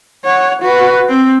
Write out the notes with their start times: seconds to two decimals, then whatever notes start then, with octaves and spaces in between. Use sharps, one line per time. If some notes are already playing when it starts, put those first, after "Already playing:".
0.24 C#5 F#5
0.62 F#4 B4
1.09 C4